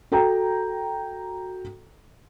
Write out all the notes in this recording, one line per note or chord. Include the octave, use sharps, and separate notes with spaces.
F#4 A4 G5 A#5